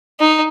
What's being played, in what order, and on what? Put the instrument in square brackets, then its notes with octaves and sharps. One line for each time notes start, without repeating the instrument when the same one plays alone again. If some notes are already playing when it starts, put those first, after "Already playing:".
[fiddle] D#4